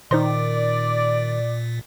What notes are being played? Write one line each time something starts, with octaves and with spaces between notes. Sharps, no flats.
A#2 D#3 D#4 C5 D5 C6